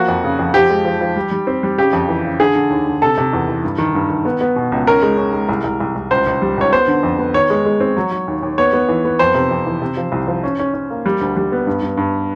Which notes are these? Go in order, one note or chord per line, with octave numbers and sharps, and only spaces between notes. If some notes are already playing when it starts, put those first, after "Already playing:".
Already playing: F3 A#3 F#4
F2
C#3
F2
F3 G4
G#3
F3
F3
G3
G3
C4
G3
C#3 G4
F2
E3
C#3
D3 G#4
D3
D#2
D3
C3 A4
C3
E2
E3
G2
D#3
G2
D#3
B3
B3
B2
C#2
C#4 A#4
G#3
C#4
G#3
C2
C2
C2
C2
C#2 C5
C#2
G3
C#2 C#5
B3 C5
D3
F2
B3
D#3 C#5
G#3
G#3
C4
F#3
F#3
D#2
D#2
B3 C#5
B3
E3
B3
F2 C5
C3
F2
E3
C3
F3
C2
F3
C#4
C#4
C#4
A#3
G3
D2
G3
B3
G2
G2
G2